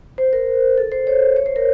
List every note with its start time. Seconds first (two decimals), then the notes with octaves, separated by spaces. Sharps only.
0.18 C5
0.33 A#4
0.78 A4
0.92 C5
1.07 C#5
1.36 C#5
1.46 C5
1.56 A#4